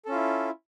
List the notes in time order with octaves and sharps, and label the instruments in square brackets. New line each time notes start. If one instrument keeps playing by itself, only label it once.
[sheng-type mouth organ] A4
C#4
F4
E4